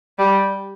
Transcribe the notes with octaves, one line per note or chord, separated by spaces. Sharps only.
G3